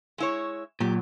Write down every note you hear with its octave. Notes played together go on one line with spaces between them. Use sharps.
G#3 E4 C#5
A#2 F#3 G4